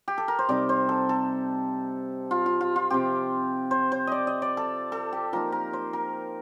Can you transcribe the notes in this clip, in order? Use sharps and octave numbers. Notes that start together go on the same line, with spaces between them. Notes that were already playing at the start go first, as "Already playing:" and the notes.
G4
A4
A#4
C5
C3 G3 C4 D#4 D5
C5
A4
A4
F4
F4
F4
F4
C3 F3 C4 G4
C5
C5
D5 D#5
D#5
D5
A4
A4
G4
F3 A#3 D#4 A#4
A#4
C5
A#4